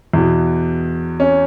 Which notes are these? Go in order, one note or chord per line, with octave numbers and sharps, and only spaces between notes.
E2 B2
C#4